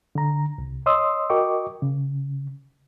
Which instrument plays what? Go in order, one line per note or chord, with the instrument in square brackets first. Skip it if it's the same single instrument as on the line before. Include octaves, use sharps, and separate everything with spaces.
[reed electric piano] D3 A#5
C2
C#5 D#5 C6 D#6 E6
F#4 A#4 D#5 G5 C#6 D6
C#3